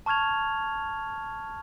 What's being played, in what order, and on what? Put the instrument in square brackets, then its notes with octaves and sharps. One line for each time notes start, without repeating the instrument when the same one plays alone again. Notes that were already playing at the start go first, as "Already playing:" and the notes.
[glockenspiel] A5 C#6 F6 G#6 F7